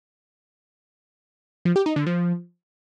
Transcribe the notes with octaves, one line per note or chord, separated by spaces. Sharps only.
F3
G4
D#4
D3
F3